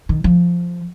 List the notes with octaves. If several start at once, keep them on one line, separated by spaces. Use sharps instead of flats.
D#3
F3